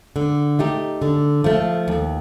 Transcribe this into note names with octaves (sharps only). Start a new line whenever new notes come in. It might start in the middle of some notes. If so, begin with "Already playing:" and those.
D3
A3 D#4 G4
D3
F3 A3
D#2